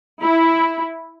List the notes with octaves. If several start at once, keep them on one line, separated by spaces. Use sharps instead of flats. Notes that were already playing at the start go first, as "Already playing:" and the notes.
E4